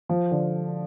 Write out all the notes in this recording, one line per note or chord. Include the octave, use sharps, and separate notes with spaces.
F3
D3